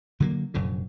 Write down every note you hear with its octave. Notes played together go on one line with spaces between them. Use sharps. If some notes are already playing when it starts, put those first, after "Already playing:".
D3 F#3 G3 A#3
F1 F#2 A#2 D3